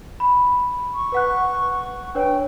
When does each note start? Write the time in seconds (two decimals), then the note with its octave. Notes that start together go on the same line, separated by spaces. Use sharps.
0.20 B5
0.94 C#6
1.12 B4 F#5 F#6
2.15 D4 B4 C#5 G5